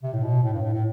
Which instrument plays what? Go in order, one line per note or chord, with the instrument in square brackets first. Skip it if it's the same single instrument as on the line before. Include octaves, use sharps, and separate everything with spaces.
[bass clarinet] C3
A2
B2
A2
G2
A2
A2